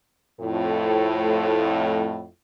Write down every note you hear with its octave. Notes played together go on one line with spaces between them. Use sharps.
F2 A2